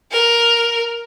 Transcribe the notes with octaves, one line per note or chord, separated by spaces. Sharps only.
A#4